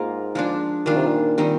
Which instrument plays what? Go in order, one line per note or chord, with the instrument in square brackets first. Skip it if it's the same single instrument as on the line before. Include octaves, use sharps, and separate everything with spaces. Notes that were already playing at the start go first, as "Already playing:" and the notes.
Already playing: [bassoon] G#2 [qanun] A#3 F4 A#4
[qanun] F3 G#3 D4
[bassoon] A#2 [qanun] D#3 G3 D4 F4
[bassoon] C3
A#2
[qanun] D#3 G3 C4 D#4